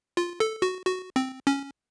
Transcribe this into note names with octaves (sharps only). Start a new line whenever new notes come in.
F4
A4
F#4
F#4
C4
C#4